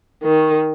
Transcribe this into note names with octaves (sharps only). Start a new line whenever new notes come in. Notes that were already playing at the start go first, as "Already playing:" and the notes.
D#3